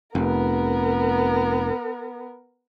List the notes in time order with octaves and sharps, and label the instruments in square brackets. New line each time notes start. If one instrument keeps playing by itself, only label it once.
[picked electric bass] F1 [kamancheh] B3 A#4